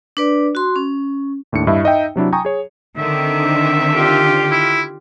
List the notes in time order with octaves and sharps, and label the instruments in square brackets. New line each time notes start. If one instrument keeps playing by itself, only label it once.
[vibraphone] D4 B4 D5
F#4 C6
C#4
[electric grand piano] D#2 A2 D4 C#7
G2 E4 D#5 E5
D#4 D#5 E5 G5
C3 F#3 D4 E4
G5 G#5 A#5 C#6 D#6
G#4 C#5
[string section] D3 D#3 C4 [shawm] E5
[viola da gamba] F4 G4
[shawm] E4